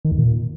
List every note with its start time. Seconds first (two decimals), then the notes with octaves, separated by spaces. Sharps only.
0.05 D#3
0.11 E2
0.18 A#2